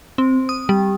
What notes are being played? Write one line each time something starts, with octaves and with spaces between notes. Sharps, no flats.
C4
D#6
G3